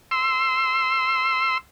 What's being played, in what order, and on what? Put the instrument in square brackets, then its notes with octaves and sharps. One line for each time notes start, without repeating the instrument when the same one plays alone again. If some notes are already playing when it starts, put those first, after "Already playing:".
[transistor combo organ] C6 E6